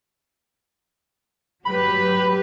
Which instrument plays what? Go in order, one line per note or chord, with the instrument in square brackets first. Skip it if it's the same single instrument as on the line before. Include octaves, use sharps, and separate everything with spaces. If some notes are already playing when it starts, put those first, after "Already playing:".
[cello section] F#3 G4 B4 [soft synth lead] B5